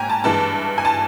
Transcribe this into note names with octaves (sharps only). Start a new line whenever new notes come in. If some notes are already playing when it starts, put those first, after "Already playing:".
Already playing: G#2 G5 G#5 A#5
A5
G2 E3 G#3 A5
G#5
A5